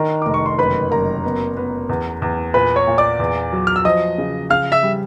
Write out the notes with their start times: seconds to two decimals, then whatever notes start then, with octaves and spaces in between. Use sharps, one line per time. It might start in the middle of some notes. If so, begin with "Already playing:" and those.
Already playing: D#3 D4 A#4 A#5
0.22 F1 D6
0.34 C#6
0.46 C6
0.59 F#1 B4 B5
0.91 F#1 A#4 A#5
1.24 B3
1.57 B3
1.89 E2
2.22 E2
2.54 A#2 B4 B5
2.76 C#5 C#6
2.87 A#2
2.98 D5 D6
3.20 E2
3.53 F#3
3.67 F6
3.76 E6
3.85 F3 D#5 D#6
4.18 C#3
4.50 C#3 F5 F6
4.72 E5 E6
4.83 G3